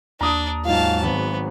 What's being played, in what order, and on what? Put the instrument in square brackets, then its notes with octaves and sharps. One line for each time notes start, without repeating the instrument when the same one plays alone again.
[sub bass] D#2 [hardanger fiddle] D4 [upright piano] A#5 D#6
[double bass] G#2 F#3 [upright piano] D#4 F4 [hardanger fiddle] F5 A5
[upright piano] G#1 [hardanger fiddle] B3